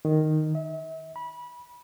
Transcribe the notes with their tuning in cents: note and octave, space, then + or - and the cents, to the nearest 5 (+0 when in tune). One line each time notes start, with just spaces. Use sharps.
D#3 -5
E5 -40
B5 -25